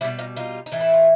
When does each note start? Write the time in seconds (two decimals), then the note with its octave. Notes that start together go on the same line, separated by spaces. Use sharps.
0.01 B2 G3 E4 F#4
0.19 D#4 F4
0.36 D#4 F4
0.66 D#4
0.72 A2 E3 A3
0.80 E4
0.93 F4